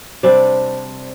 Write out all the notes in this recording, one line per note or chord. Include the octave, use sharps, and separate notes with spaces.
C3 G3 C4 D4